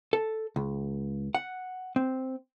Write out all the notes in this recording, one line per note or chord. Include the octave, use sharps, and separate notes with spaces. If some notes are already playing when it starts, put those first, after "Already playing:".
A4
C#2
F#5
C4